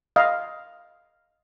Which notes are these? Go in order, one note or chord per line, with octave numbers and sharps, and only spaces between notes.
D#5 F5